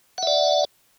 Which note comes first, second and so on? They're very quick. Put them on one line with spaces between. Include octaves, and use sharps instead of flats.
F#5 E5 D5